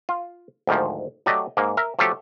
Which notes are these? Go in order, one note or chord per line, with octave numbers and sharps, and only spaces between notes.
F4
D2 G#2 D#3 F3
F#3 A3 G4 D5 D#5
G#2 A#3
A#4 E5
F3 F#3 A3 F4 G4 A4